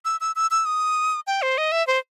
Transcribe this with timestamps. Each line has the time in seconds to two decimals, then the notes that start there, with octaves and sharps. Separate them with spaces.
0.05 E6
0.21 E6
0.36 E6
0.51 E6
0.65 D#6
1.27 G5
1.42 C5
1.58 D#5
1.72 E5
1.87 C5